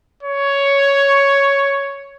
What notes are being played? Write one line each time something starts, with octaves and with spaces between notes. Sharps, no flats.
C#5